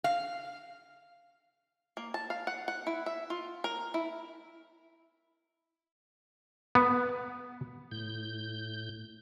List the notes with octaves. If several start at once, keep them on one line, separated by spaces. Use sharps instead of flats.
F5
A#3
A5
F5
F#5
F#5
E4
E5
F4
A#4
E4
B3
A2 G6